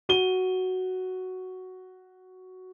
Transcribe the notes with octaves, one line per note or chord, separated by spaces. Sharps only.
F#4 D#7 G7